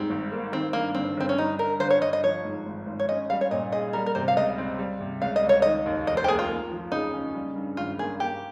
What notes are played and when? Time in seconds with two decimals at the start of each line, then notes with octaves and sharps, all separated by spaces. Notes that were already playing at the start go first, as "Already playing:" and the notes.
Already playing: G#2 G3 C4
0.10 G#1
0.32 A#3
0.52 D#3 C4
0.73 G2 A#3
0.95 G1 C4
1.17 G1 C4
1.29 C#4
1.38 G3 D#4
1.59 G2 A#4
1.80 G1 C5
1.91 C#5
2.01 G1 D#5
2.13 D#5
2.23 F3 C#5
2.45 G#2
2.66 G#1
2.87 G#1
3.00 C#5
3.09 C#4 D#5
3.30 G3 F5
3.41 C#5
3.51 A#2 D#5
3.72 G#4 D#5
3.93 G3 A#4
4.06 A#4
4.15 C3 C5
4.28 F5
4.37 C#2 D#5
4.58 C4
4.78 G3
5.00 C3
5.22 C#2 F5
5.36 D#5
5.44 C#2
5.49 C#5
5.62 D#3 D#5
5.86 D#2
6.07 F1 D#5
6.17 C5
6.24 G4
6.28 A#3 G#4
6.39 F4
6.49 A#3
6.71 F3
6.92 C#3 D#4
7.14 C#4
7.34 G3
7.56 G2
7.77 G#1 F4
7.98 A#3 G#4
8.20 A#3 G4